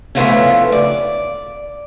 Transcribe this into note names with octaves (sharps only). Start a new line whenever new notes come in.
C#3 E3 F3 A3 B3 C#4
D5